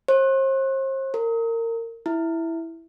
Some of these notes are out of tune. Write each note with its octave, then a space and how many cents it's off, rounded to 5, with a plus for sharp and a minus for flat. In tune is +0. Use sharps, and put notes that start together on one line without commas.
C5 +40
A#4 -25
E4 +0